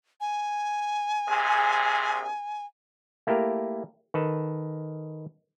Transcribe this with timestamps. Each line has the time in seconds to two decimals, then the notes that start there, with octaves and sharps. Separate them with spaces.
0.21 G#5
1.28 A#1 C3 G#4
3.27 A3 A#3 E4 G4 A#4
4.14 D#3 A4 B4 A5